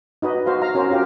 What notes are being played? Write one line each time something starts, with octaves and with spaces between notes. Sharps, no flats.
D#4 F#4 B4 D#5
F#4 C5 F5
F5 A#5
C#4 F#4 A#4 C5
C#4 F4 G4 F5